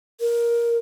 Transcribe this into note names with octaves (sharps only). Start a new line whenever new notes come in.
A#4